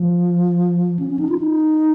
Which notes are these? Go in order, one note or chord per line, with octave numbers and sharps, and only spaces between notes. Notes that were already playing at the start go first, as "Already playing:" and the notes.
Already playing: F3
C#4
C#4
D#4
F4
D#4